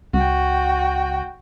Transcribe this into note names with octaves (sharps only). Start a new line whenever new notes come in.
C#2 F#4 G5